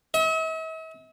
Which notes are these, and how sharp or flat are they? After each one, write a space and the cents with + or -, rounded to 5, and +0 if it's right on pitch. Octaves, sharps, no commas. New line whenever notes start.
E5 -45